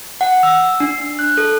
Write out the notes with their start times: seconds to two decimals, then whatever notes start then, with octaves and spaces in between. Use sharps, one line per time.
0.21 F#5
0.43 E6
0.80 D4
1.19 F#6
1.37 A4